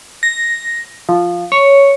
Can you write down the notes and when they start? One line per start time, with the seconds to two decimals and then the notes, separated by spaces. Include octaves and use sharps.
0.23 A#6
1.09 F3
1.52 C#5